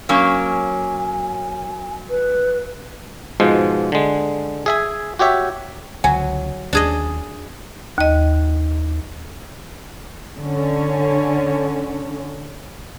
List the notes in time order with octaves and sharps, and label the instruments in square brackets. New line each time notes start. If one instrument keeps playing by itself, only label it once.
[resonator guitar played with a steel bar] F#3 A#3 C#4 [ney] G#5
[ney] B4
[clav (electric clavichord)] G#2 B2 F3 G#3
D3 G#3
G#4 E5 G#5
F#4 G4 C#5 E5
[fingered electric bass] C#2 D3 [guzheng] F#3 [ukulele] G#5
[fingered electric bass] D#2 [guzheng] D4 G#4 D#5
[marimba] D#2 D#5
[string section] D3 C#4